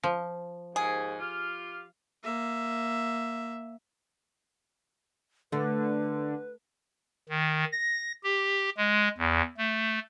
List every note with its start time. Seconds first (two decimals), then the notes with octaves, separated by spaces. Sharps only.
0.03 F3
0.76 D#2 G#2 G#4
1.19 F4 G4 F5
2.24 A#3 E5
5.52 D3 A3 B4
7.29 D#3
7.72 A#6
8.23 G4
8.77 G#3
9.18 E2
9.57 A3